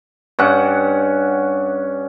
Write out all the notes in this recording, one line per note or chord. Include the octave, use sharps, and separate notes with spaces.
G2 C#4 F#5